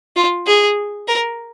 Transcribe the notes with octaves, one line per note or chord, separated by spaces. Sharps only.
F4
G#4
A#4